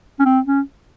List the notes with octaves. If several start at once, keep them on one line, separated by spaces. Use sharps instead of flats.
C#4
C4
C#4